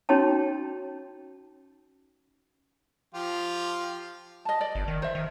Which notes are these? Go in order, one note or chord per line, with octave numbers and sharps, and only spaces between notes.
C#4 D#4 F#4 C#5 G5 A5
F3 F4 G4
D#5 A5
D5
G1
D#3
C5 E5
D#3